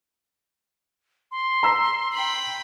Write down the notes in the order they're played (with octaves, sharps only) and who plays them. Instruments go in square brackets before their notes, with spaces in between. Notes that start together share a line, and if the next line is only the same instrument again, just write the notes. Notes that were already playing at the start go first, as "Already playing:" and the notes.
[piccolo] C6
[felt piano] A#5 E6 B6
[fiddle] G5 B5